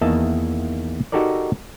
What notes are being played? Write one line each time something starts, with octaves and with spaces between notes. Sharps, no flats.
E2 D#3 A#3 D#5 E5 A5
D#4 F#4 G4 A4 A#4 D5